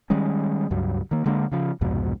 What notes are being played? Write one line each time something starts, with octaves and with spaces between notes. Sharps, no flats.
D#3 G3 G#3 C#4
C#2 G2 F#3
D#3 A#3
D3 G#3 A#3 D4
C#3 F3
C2 F2 G#2 B2